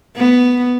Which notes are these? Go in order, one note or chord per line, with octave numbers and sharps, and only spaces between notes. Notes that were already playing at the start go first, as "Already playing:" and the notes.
B3